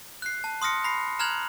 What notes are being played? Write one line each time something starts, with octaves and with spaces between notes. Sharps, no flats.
F#6 C7
A5
C6 D#6 F6 A#6 C#7
B5 A#6 C7
A#5 F6 F#6 G#6 F7 F#7